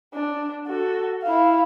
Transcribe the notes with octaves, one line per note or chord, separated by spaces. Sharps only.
D4
F#4 A4
E4 F5